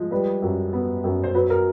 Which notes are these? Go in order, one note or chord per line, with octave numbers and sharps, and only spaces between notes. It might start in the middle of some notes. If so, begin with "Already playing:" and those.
Already playing: F3 G#3
G3 B4
F#2
B3
F#2
C5
F#3 B4
A#4